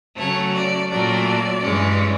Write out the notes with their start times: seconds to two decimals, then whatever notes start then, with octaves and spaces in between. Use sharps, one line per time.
0.18 C#3 F#3 A3 C#5
0.54 D5
0.90 A#2 F#3 A3 D5
1.63 G2 E3 G#3 C#4